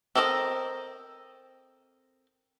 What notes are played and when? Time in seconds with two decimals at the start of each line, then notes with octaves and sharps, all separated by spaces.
0.15 C4 A4 A#4 C#5 D#5